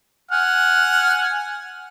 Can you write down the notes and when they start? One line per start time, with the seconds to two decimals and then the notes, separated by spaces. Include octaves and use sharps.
0.31 F#5 G#5 F6